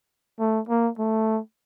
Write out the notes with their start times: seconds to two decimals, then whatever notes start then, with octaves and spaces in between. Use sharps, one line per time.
0.40 A3
0.69 A#3
0.99 A3